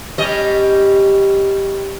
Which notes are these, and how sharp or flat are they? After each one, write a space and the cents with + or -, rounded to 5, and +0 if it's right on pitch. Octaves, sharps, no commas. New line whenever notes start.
G3 +0 C#4 +10 D#5 +0